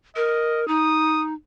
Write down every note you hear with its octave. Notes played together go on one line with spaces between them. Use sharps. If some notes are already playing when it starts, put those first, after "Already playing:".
A#4 D#5
D#4 D#6